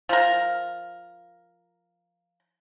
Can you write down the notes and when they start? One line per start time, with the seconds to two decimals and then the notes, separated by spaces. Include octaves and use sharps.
0.09 F3 A#4